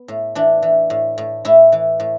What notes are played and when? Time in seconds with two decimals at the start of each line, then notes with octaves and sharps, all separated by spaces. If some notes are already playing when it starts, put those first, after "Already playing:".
Already playing: B3
0.08 A2
0.35 E3 D4
0.62 E3
0.90 A2
1.18 A2
1.45 A2 E4
1.72 E3
2.00 A2